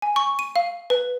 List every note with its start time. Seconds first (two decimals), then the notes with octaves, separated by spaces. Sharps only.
0.02 G#5
0.16 C#6
0.39 D#7
0.56 F5
0.90 B4